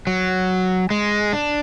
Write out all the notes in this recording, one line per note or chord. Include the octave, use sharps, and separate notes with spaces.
F#3
G#3
D4